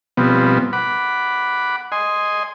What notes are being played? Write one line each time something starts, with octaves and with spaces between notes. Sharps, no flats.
B2 F3 G3 B3 C4
F#5 B5 D6
D#5 G#5 C6